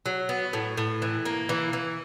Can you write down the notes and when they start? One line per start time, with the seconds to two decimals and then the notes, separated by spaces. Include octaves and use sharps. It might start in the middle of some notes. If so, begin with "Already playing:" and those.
0.06 F#3
0.29 B3
0.53 A2
0.77 A2
1.02 E3
1.25 A#3
1.49 E3
1.73 E3